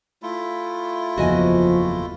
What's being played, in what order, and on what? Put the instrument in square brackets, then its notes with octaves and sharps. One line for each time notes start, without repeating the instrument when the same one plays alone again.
[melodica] A3 E4 F4
[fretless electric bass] F#1 E2 [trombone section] F3 [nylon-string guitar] F#4 D#5 G#5